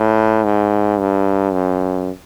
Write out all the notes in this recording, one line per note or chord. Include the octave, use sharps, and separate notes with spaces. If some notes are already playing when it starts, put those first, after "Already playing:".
Already playing: A2
G#2
G2
F#2